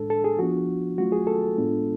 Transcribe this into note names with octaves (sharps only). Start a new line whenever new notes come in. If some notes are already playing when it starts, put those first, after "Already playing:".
Already playing: A2 G#3 D4 A4
A4
G#4
F3 B3 D4 F4 F#4
F#3 A3 C#4 F4 F#4
G#4
A4
A2 G#3 B3 D4 F4